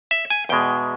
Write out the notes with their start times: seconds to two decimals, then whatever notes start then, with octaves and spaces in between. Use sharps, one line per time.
0.11 E5
0.30 G#5
0.49 E2 B2 G#3 G5